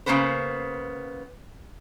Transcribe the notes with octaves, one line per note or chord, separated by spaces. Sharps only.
C#3 F3 A#3 B3 B4 C5